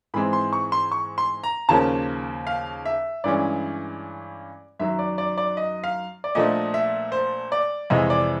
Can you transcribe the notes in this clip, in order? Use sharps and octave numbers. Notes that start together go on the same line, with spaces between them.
G#2 E3 G#3 C4 B5
C6
C#6
C6
C#6
C6
A#5
D#2 C#3 F3 A#3 C#4 A5
F5
E5
G2 E3 G#3 C#4 D5
F#2 D#3 F#3 E5
D5
D5
D5
D#5
F5
D5
A#2 F3 A3 D4 D#5
E5
C5
D5
F2 C3 E3 G#3 D#5
D5